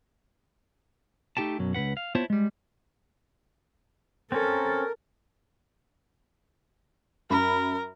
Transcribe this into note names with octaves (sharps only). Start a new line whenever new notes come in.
A3 D#4 G4 G5 A5
F#2 B2 F#3
C#2 C3 B4 F#5
F5
B3 E4 F4 C5 C#5 A5
G3 G#3
C4 C#4 A4 A#4
F#2 A#4 B5